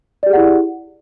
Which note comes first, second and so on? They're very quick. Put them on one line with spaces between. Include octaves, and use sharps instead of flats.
D5 G4 G#4 F#5 E4